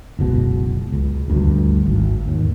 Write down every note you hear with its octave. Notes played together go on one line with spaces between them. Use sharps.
F#1 C#2 B2
C#2
G1 D2 G2
G#1
D#2